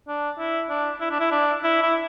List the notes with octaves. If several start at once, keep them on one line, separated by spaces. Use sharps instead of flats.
D4
E4
D4
E4
D4
E4
D4
E4
E4